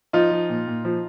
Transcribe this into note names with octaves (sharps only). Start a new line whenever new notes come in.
F3 D#4 F4
F3
A#2
A#2
F3